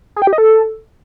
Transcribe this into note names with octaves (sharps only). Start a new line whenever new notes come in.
G#4
G5
G4
D#5
A4